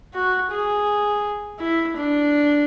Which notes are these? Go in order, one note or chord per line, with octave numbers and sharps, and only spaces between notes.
F#4
G#4
E4
D4